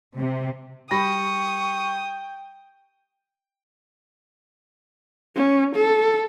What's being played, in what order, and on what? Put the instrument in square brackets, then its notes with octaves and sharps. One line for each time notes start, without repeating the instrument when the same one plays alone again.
[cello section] C3
[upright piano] G3 B5 A#6 [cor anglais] G5 [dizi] C#6 [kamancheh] D#6
[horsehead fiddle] C#4
A4